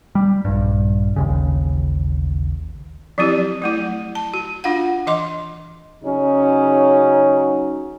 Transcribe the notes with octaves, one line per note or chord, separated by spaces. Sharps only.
G3
A#1 G2
A1 D#2 C#3
F3 F#3 C4 E4 G4
F#3 A3 E4
A5
F#4
D4 F4 F5 F#5
E3 D#5 C6
C#3 F#3 C#4 D#4